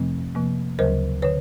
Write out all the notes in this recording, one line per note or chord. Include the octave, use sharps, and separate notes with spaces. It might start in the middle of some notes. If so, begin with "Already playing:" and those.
Already playing: F2 C3 F3 A3 C4
C3 F3 A#3
D2 C#3 F#3 A#4 C5
D3 B4 C#5